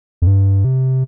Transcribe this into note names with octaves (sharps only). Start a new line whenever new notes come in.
F2
G2
C3